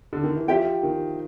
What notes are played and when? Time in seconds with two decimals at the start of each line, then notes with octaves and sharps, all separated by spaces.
0.13 D3
0.24 D#3
0.36 E3
0.48 F3 G4 C5 E5 G5
0.83 D#3